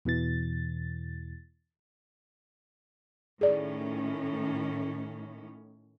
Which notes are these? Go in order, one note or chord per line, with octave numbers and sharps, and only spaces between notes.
E2 B2 E3 A6
A2 D#3 C#4 G#4 D5